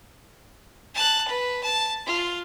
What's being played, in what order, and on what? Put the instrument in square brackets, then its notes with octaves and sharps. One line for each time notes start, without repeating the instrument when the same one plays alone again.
[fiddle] A5 F#6
B4
A5
F4